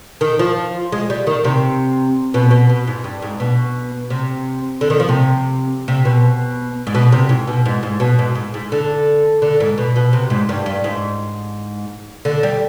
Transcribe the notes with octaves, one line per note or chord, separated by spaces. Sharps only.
D#3
F3
G#3
G3
D#3
C3
B2
B2
B2
G#2
G2
G#2
B2
C3
D3
D#3
F3
C3
C3
B2
G#2
B2
C3
G#2
B2
G#2
G#2
B2
G#2
G#2
G#2
D3
D3
G#2
B2
B2
C3
G#2
G2
G2
G#2
D3
G3